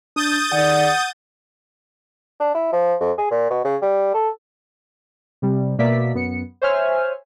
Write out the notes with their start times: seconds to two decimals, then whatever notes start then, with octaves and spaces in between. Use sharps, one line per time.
0.16 D4 D#6 G6 A6
0.52 D#3 G#4 D5 F#5
2.40 D4
2.54 E4
2.72 F3
3.00 F2
3.18 G#4
3.31 A#2
3.50 B2
3.65 C#3
3.82 G3
4.14 A4
5.42 C3 G3
5.78 B2 A#3 D5 E5 B6
6.14 F#2 B3 C#7
6.62 C5 C#5 E5 G#5 F6